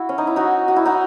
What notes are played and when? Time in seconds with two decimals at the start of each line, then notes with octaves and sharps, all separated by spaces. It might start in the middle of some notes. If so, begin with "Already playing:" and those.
Already playing: E4 F#4
0.09 C#4
0.18 D#4
0.27 E4
0.36 D#4 F#4
0.68 F#4
0.76 E4
0.86 D#4 F#4